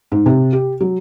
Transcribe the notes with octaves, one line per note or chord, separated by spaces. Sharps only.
G#2
C3
G4
F#3